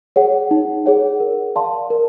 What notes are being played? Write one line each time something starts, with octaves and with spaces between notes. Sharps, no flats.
G#4 C#5 F#5
D#4
G#4 C#5 F#5
A#4
D5 F5 A5 C6
A#4